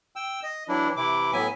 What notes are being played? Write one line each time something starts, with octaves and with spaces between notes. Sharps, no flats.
G5 E6
D#5
E3 F#3 D4 E4
C3 E3 E4 D6
A2 F#3 B3 E5 G#5